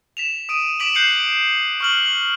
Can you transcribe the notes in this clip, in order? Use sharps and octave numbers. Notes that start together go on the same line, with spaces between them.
B6 E7 F7
D#6 D7 D#7
D6 B6 D7 E7 F#7
F#6 G6 C7 C#7 E7 F#7
C#6 F6 F#7